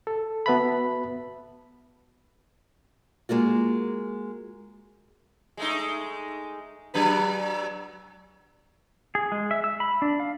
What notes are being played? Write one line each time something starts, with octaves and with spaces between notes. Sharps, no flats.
A4
B3 F#4 B4 E5 A5 B5
G#3 A#3 F4 F#4
G#3 A3 D#4
F#3 D4 B4
G#4
G#3
E5
E6
B5
D4
F5